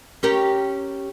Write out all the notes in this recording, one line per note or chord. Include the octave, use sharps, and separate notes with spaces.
C#4 G4 A#4